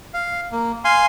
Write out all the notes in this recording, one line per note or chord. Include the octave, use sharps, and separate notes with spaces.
F5
A#3
F5 G#5 C6